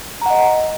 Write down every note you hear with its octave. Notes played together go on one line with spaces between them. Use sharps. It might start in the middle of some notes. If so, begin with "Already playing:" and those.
D#5 F#5 A#5